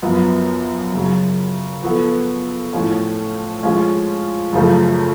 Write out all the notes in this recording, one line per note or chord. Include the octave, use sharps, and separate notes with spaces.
F#2 F3 B3
F#2 C#3 F#3
F3 B3 F#4 A4
A2 F3 A3 C#4 F4
F3 G#3 C#4 F4
F#2 C#3 F3 A3